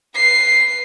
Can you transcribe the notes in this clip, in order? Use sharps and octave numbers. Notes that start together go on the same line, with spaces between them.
B4 C7